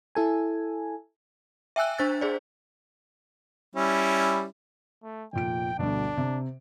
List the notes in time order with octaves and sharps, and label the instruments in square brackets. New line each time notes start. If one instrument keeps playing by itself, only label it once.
[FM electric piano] E4 A4 G#5
[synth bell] E5 G5 G#5 E6 F#6
D4 C5 E6 A6
G#4 C5 D5
[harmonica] G3 C#4 E4
[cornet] A3
[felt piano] F1 A#2 D7 [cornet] G5
[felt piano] D2 G2 B2 [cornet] D4
[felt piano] C3